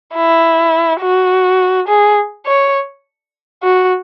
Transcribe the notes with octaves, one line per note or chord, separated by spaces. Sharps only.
E4
F#4
G#4
C#5
F#4